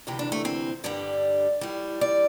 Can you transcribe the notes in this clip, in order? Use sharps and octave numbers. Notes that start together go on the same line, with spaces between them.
D2 C3 E3 G4
D4
A3
C4
G2 D3 G3 D5
A2 G3
D5